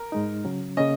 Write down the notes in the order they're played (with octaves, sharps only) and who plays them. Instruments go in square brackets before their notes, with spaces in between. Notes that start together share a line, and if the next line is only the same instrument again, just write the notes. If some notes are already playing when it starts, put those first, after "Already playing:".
Already playing: [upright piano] A#4
[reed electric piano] G#2 G#3 D#4
C#3 F#3 C#4
[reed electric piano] C#3 A#3 C#4 [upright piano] D#5